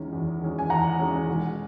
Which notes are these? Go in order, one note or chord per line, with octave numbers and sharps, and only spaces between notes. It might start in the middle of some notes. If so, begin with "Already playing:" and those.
Already playing: E2 D#3 G#3 C#4
E2
D#3 G#3 C#4
G#5
E2 F#5 A#5
D#3 G#3 C#4
E1